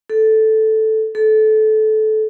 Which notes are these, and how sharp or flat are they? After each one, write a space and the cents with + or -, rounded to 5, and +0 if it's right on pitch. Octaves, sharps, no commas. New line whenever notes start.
A4 -5
A4 -20